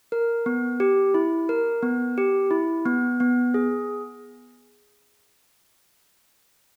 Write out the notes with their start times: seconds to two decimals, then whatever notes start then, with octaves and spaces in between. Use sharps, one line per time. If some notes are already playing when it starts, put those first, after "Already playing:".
0.12 A#4
0.46 B3
0.80 G4
1.14 E4
1.49 A#4
1.83 B3
2.18 G4
2.51 E4
2.86 B3
3.20 B3
3.54 G#4